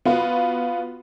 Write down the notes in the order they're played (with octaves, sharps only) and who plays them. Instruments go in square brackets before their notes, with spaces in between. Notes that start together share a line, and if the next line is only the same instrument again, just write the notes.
[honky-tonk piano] B3 F4 F#4